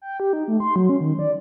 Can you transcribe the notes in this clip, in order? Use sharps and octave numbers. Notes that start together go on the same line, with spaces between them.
G5
G4
D#4
A3
C6
F#3
C#4
D#3
D5